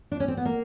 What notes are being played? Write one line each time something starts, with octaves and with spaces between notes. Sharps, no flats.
D4
C#4
C4
B3
A#3